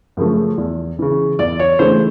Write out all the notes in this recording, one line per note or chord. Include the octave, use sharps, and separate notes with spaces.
F#2 C#3 F3 A3
E2
C#3 E3
E2 D5
C#5
C#3 E3 A3 D4 C5